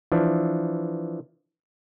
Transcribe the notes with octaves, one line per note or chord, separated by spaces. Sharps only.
E3 F3 D4